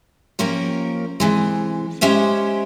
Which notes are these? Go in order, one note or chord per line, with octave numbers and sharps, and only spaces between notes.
F3 A#3 C#4 G4 A#4
C3 E3 G#3
G#3 C#4 G4 C5 E5